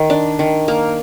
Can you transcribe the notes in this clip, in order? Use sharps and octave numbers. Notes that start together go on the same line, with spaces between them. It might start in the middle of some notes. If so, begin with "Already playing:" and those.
Already playing: D#3
D4
D#3
A#3